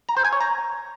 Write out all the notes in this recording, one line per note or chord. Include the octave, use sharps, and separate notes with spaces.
A#5
C5
G#5
C#5
A#5